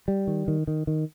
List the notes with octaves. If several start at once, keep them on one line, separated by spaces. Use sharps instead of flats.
G3
D#3
D#3
D#3
D#3